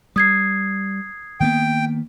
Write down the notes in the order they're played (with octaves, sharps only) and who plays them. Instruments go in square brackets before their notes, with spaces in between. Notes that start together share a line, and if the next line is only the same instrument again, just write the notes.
[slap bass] G3 [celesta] D#6 G#6 C7
[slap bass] D#3 A#3 B3 [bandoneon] G5